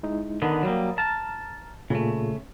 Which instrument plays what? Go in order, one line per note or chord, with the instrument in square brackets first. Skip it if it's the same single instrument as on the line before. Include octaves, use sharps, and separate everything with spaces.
[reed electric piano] G#3 D#4 E4
[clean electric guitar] D3 D#3 B3 [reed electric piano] A#4 A#5 D#6
[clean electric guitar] F#3 G3 A#3
[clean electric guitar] A5 [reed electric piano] A#5 F6 A6
[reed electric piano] A#2 F4 G#4 [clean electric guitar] C#3 A3